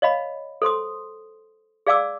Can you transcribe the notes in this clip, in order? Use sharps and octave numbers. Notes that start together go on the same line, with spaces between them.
C#5 D#5 F5 B5
A4 C5 C6 D#6
G#4 D5 F5 G#5 D6 E6